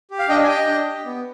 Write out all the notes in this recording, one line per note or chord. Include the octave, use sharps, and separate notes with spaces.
G4
F5
D4 D#5 G5
G#5
G4 D#5 G5
D4
G4
B3